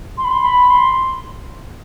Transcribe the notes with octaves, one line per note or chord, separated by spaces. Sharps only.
C6
B5
C6
B5
C6